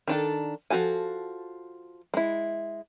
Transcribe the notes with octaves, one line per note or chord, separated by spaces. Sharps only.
D#3 D4 A4
F3 E4 F#4 A4 G#5
G#3 E4